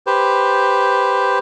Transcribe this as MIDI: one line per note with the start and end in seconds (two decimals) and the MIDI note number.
0.07 1.39 67
0.07 1.39 71
0.07 1.39 72